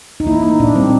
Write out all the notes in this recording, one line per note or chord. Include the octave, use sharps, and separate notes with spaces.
D#4
A#3 E4
A#3 D#4
A#2 D4
G3 C4